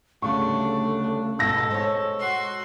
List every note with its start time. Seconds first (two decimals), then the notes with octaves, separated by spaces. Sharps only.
0.22 D2 C#3 G3 A3 D4 C#6
1.39 G#2 B2 G#3 B3 A4 E6 A#6
1.71 C5 C#5
2.20 F#4 C6